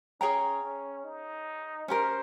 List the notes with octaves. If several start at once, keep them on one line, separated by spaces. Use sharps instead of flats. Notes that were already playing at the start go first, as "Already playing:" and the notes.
C#4 G#4 C#5 G5 A#5
C#4
D#4
C#4 G4 A#4 C5